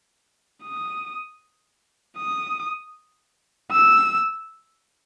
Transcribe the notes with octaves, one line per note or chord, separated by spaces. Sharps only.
D#6
D#6
E6